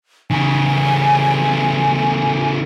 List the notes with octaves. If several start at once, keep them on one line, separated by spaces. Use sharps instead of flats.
C#3 E3 G#5